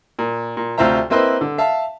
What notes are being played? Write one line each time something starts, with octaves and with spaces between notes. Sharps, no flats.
A#2
A#2
D2 C3 F4 C5 E5 A#5
A#3 C4 E4 B4 C5 D#5
D3
E5 F5 A5